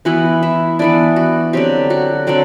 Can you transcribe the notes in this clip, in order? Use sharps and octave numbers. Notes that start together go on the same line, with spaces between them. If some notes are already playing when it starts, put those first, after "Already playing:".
E3 B3 E4 F#4 F#5
E4 E5
E3 B3 D4 E4 D5
F#4
D3 F#3 C4 G4
F#4 F#5
D3 F#3 C4 D4 D5